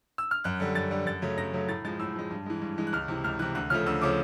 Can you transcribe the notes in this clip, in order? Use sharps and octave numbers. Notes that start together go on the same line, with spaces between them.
E6
F6
F#2 F#6
D3 G3
F#2 A6
D3 G3
F#2 A6
C#3 F#3 A3
F#2 A#6
C#3 F#3 A3
A2 A6
F3 G#3 A6
A2 E6
F3 G#3
G2
E3 G#3
G2
E3 G#3
F#6
C#2 F6
C3 E3
C#2 F6
C3 E3 F#6
D2 F#6
C#3 F3 A3 F6
D2 E6
C#3 F3 A3 D6